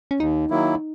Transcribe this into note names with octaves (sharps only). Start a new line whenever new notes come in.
C#4
D#2 D#4
D#3 F#3 A#3 E4